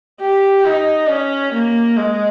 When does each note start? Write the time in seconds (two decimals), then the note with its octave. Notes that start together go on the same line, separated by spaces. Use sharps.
0.21 G4
0.65 D#4
1.09 C#4
1.53 A#3
1.97 G#3